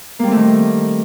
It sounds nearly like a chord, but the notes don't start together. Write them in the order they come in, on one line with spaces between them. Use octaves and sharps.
A#3 G3 C4 A3 D#3